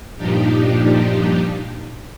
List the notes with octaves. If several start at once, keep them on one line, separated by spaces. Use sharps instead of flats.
G2 A#2 F3 D4 D#4 G4